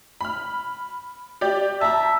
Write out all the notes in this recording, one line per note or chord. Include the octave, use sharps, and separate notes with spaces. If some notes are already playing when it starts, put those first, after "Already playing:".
B5 F6
G4 D5
E5 A5 A#5